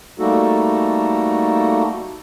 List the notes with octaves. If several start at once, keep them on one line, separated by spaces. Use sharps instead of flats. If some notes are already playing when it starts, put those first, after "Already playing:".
G3 A3 A#3 D#4 F#4 A4